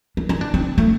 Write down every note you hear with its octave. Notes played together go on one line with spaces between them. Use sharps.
D4
D#4
D4
C4
A3